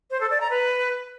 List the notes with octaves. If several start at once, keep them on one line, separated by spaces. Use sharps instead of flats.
C5
A4
D5
A#5
B4